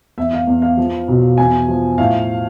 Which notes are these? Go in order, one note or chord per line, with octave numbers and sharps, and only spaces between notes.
E2 E5
F5
E2
F5
F3
B1
E2 G#5
F3
A2 F5